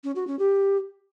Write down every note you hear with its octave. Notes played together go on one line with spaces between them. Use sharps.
C#4
F#4
C#4
G4